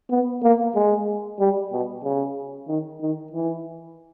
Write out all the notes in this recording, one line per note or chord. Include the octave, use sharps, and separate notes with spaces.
B3
A#3
G#3
G3
B2
C#3
D#3
D#3
E3